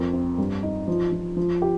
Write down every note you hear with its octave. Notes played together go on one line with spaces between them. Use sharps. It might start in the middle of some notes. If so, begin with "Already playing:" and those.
Already playing: F2 A#4
C4
G2
D#4
F3
F3
F3
G4